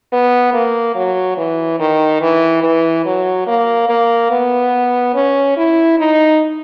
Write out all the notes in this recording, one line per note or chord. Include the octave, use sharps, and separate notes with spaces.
B3
A#3
F#3
E3
D#3
E3
E3
F#3
A#3
A#3
B3
C#4
E4
D#4